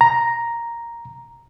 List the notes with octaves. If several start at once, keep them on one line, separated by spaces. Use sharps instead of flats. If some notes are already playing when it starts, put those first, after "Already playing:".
A#5